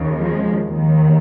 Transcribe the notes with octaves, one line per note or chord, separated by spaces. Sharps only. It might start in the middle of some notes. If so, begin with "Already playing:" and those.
Already playing: D#2 C#3
F3 G#3
D#2 D#3